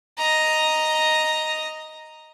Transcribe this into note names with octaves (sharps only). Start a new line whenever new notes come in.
D#5 A#5